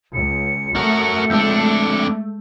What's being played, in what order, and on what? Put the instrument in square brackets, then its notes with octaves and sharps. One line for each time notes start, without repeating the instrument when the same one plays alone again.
[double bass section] C#2 [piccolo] C#7
[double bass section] A3 [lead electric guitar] F#4 A#4
[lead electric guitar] F2 D4 [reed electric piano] G#3 E6 G6